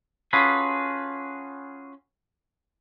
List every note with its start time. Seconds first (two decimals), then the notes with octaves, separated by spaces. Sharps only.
0.33 C#4 F4 F#4 G#4 A4 B4